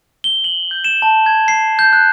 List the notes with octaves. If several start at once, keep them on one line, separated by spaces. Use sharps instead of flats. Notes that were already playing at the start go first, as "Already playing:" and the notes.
G7
F#7
G6
E7
A5
G#6
C7
G6
F#6